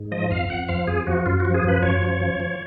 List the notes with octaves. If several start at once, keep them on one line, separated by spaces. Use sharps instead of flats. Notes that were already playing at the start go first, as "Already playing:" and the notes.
Already playing: G#2
F3 D#5
F2 F5
F2 F#5
F3 F5
F2 G#4
F3 F#4
F#2 F4
F3 F#4
G#4
F#2 B4
F#2 C#5
F3
F3
F3